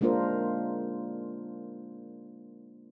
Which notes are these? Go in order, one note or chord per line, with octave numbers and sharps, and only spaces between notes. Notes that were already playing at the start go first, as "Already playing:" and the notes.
G#3 A#3 D4 F4 A#4 C5